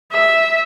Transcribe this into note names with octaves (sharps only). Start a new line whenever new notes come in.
E5